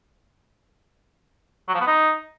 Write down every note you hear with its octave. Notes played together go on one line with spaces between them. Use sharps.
F#3
F3
B3
D#4